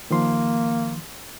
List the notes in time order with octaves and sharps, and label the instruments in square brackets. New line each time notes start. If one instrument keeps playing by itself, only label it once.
[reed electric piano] D#3 F3 C6 [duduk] A#3